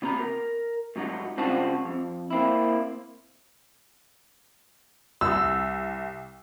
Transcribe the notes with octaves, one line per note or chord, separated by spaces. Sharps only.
C3 B3 F#4 A#5
A#4
G#2 F#3 D#4 F#4
C#2 G2 C4 F4 F#4 A5
F2
A#3 C4 E4
C2 E6